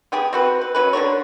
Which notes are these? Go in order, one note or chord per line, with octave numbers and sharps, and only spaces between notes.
B3 G4 G#4
C4 F#4 B4
B4
F#3 C#4 B4
D3 F#4 A#4 C#5